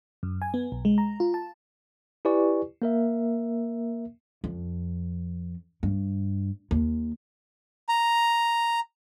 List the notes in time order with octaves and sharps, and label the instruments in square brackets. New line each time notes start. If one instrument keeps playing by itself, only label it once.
[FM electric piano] F#2
G#5
B3
B1
G#3
A#5
F4
A5
[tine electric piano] E4 G4 B4 D5 G#5 C#6
A#3 A#4 E5
[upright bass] F2
G2
D#2
[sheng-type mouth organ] A#5